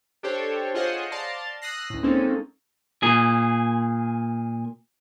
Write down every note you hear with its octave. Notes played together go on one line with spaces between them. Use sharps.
D4 G4 A4 C5 C#5 G5
F4 G#4 C5 C#5 D#5 F#5
D5 F5 A5 A#5 C6
D#6 E6 F#6 A#6 C7
C#2 A2
G#3 A#3 C4 C#4 D#4 A4
A#2 G#4